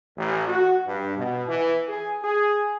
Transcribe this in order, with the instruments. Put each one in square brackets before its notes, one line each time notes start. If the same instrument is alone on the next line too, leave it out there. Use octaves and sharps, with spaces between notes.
[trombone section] A1
F#4
G2
B2
E3
G#4
G#4